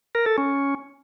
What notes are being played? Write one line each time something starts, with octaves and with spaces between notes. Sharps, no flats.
A#4
A4
C#4